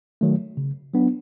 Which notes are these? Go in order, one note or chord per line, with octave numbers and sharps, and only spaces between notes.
D#3 F#3 A3
C#3
F#3 B3 D4